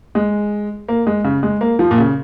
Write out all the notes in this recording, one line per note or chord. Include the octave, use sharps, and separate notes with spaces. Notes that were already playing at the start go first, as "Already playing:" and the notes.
G#3
A#3
G#3
C#3
G#3
A#3
F3
A#2
C#3